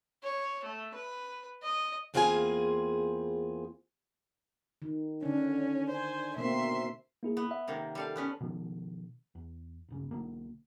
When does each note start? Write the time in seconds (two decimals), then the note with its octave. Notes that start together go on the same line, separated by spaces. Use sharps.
0.23 C#5
0.65 A3
0.94 B4
1.62 D#5
2.14 E2 A#3 C4 F4 G#4 G#5
4.82 D#3
5.23 D3 C#4 D4
5.90 C5 G#5
6.36 B2 A#3 C4 E5 C6
7.23 A#3 E4 G#4
7.37 B3
7.51 E5 F#5
7.67 C3 D#3 A#3
7.95 G3 A4 F5
8.16 B3 C#4 B4
8.41 B2 D#3 F3
9.35 E2
9.89 D1 G1 C#3
10.11 B1 D3 A#3